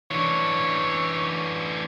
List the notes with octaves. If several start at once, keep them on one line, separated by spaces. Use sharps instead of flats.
E3 D4 C#5